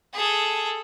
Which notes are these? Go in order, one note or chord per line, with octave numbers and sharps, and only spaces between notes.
G#4 A4